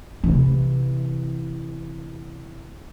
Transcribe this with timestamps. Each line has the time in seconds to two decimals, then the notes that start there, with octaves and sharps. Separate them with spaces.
0.24 C3 E3